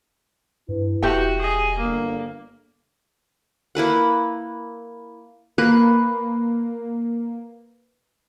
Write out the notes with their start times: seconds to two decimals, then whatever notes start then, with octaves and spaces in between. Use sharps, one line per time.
0.69 G2 E4 B4
1.03 E1 F#4 G4 E5 G5
1.40 G#4 D#5
1.78 G1 A#3
3.75 A#3 E4 B4 F#5
5.58 A#3 B4